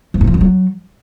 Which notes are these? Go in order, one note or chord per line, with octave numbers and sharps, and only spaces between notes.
F3
G2
F3
F#2
F#3